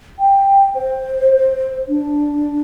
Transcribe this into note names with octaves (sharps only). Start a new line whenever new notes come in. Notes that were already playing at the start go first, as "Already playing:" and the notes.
G5
C5
D4